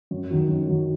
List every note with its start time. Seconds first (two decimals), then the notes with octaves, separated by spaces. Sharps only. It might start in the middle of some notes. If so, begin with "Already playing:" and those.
0.11 F#2
0.30 D#3 F#3
0.49 F#2
0.67 D#3 F#3